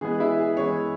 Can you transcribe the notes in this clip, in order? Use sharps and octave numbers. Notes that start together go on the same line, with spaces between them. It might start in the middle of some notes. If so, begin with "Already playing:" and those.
E3 G#3 B3 G#4
E4
G#4
E3 G#3 B3 C#5